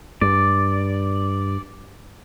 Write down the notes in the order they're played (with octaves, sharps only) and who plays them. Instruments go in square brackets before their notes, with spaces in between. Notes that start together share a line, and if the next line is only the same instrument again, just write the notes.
[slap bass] G2 [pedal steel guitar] D5